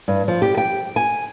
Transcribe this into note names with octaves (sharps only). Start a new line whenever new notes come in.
G2
F3
G4
G5
G#5